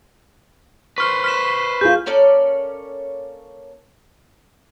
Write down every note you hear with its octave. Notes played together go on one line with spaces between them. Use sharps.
B4 C5 C#6 F6
F6 B6 E7
F4 G#4 G6
A#3 C#4 A4 D5